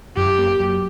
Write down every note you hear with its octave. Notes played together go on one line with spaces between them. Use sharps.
F#2 G4
A#3
F#3